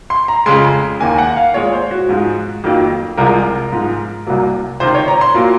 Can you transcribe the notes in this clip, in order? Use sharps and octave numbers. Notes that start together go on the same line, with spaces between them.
C6
A#5
F2 C#3 G#3 C6
D#2 D#3 A#3 G#5
F#5
F5
A#2 G#3 C#5
C5
F#4
G#2 F3 G#3
F2 D#3 F#3 A#3
C2 C3 F3 G#3 A#4
G#2 F3 G#3
C2 C3 F#3 A#3
C#2 C3 D#3 C5
C#5
A#5
C6
A#2 F#3 A#3